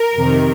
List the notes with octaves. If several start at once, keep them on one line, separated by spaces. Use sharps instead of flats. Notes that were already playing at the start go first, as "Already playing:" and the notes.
Already playing: A#4
F2 C3 D#3